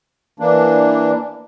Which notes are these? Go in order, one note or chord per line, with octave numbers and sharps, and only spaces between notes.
E3 A#3 D4